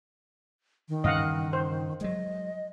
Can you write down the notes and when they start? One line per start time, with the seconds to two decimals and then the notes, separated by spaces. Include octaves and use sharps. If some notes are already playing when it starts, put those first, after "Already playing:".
0.89 D#3
1.04 G2 C#3 E3 D#5 F5 F#5
1.53 C5
2.01 F#3 G#3 D#5